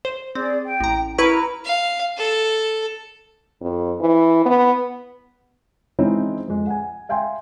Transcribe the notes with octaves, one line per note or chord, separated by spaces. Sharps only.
C5
C4 G#4 D5
G5
A1 A#5
E4 A#4 B4 A#5 B5 C#6
F5
A4
F2
E3
B3
E3 G#3 C4 C#4 D#4 E4
F2 G#3
F#5 G#5
E5 F5 G5 G#5 C6